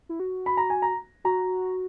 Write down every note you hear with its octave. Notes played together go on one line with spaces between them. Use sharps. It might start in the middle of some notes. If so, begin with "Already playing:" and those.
E4
F#4
B5
A#5
G#5
A#5
F#4 A#5